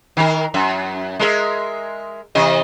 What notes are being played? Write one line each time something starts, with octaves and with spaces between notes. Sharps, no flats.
D#3 A#4
F#2 E5
G#3 A#4 E5
C3 E3 D#5